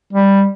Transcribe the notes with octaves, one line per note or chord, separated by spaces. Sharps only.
G3